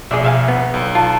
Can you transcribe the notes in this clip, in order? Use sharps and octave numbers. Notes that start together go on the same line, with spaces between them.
A#1 B2 G#4 D5 E5
B2 E5 F5 G#5
B3
B1
F4 A5